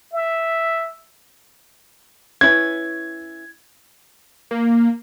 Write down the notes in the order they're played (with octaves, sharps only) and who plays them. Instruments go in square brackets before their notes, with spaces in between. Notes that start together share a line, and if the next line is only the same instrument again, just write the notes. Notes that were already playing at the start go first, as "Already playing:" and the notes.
[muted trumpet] E5
[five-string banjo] C#4 E4 B4 [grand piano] G#6
[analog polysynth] A#3